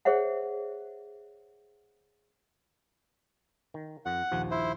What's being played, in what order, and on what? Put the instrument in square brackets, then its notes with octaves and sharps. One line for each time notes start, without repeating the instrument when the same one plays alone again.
[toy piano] G#4 C5 C#5 E5 F#5
[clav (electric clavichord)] D#3
[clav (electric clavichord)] F2 [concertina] F#5
[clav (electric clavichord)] A#1 D#2 F3
[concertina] E4 C5